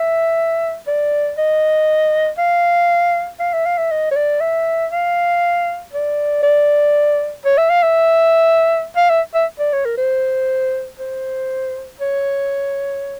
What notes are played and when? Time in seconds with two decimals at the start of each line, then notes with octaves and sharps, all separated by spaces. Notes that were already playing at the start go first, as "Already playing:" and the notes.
Already playing: E5
0.87 D5
1.38 D#5
2.38 F5
3.40 F5
3.53 E5
3.66 F5
3.78 E5
3.91 D#5
4.11 C#5
4.16 D5
4.40 E5
4.92 F5
5.93 D5
6.43 D5
7.45 C#5
7.58 E5
7.70 F5
7.83 E5
8.96 F5
9.10 E5
9.34 E5
9.59 D5
9.73 C#5
9.85 A#4
9.97 C5
10.99 C5
12.00 C#5